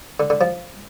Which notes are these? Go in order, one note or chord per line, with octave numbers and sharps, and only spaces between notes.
D3
D3
F3